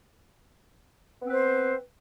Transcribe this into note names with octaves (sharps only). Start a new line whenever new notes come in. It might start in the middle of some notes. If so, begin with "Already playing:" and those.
B3 C4 B4 C5